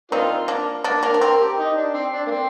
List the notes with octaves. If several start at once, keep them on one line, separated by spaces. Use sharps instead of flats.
A#3 C4 D4 D#4 F4
A#3 D4
A#3 D4
A#3 D4 A#4
D4
C4 A#4
G4
D#4
D4
C4
D4
A#3
C4